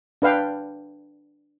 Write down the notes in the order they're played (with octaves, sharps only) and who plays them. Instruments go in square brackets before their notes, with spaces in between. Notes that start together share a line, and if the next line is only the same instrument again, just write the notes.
[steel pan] D4 B4 F5 G5